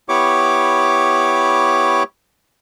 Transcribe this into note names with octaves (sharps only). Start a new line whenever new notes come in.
B3 E4 G4 C#5 C#6 D6